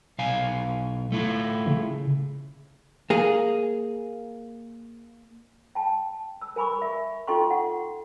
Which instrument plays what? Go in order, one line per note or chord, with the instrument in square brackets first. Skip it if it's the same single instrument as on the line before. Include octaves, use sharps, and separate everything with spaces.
[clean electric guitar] B1 F5 G#5
A3 E4 F4
[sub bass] C#3
[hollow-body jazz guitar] A#3 G#4
[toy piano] G5 A5
E6
A#4 G#5 B5 C#6 D6
A#4 E5
D#4 F4 A4 G5 C6 C#6
F#5